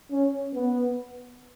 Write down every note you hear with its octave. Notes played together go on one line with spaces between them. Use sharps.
C#4
B3